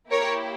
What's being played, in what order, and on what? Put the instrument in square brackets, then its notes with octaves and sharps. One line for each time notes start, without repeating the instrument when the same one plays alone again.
[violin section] A#3 E4 G4 A#4 C#5